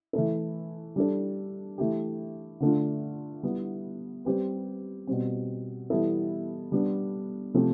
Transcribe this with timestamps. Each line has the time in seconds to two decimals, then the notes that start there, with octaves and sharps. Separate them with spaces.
0.13 E3 A3 E4 A4
0.96 G3 D4 A4
1.78 E3 A3 E4 G4
2.60 D3 A3 D4 F4
3.43 G3 B3 E4
4.25 G3 C4 G4 B4
5.07 B2 G3 C4
5.90 E3 G3 B3 E4 A4
6.72 G3 B3 D4
7.54 C3 F3 A3 C4 G4